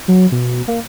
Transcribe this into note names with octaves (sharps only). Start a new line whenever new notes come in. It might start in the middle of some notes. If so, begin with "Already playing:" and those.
F#3
B2
A#3